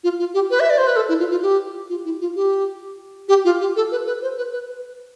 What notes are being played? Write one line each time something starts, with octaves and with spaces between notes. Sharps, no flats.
F4
F4
G4
B4
E5
D5
C5
B4
A4
E4
F4
F4
G4
F4
E4
F4
G4
G4
F4
G4
A4
B4
B4
C5
B4
B4